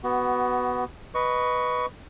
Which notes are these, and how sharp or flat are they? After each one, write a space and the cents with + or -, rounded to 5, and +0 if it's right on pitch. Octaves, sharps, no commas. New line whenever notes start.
B3 +0 F#4 +20
B4 +0 D#5 +0 C#6 +15